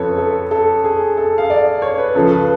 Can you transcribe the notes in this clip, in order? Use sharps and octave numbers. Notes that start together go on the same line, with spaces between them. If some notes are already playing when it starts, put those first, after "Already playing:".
Already playing: F2 C#3 F3 A4 B4 C#5
A4
A4
G#4
A4
F5
D5
C#5
B4
C#2 C#3 F3 A4
B4